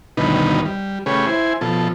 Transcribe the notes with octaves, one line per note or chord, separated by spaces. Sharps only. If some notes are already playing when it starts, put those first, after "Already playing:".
D2 G2 B2 D#3 D#4 B4
G3
C#3 A3 G4 G#4 B4 C#5
E4 C5 G#5
B2 F3 A4